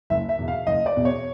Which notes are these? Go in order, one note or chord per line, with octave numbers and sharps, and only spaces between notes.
F#1 E5
E5
E2 B2
F5
F#1 D#5
D5
E2 B2
C#5